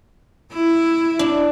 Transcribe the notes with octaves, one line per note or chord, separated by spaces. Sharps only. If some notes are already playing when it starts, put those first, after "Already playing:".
E4
D4